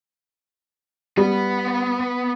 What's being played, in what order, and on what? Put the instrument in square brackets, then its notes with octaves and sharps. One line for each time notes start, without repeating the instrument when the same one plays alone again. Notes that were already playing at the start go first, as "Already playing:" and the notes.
[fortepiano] G3 [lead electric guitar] B3 B4